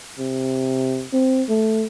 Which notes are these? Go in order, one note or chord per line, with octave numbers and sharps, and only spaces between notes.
C3
C4
A3